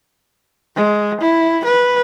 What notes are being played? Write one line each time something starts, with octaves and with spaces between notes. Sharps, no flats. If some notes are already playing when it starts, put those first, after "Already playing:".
G#3
E4
B4